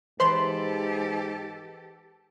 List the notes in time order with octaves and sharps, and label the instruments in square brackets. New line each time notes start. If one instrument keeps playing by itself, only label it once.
[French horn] G#2 [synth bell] E3 B4 [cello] G4 A4 [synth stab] C5 C6